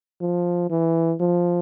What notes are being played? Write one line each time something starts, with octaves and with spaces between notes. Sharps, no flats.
F3
E3
F3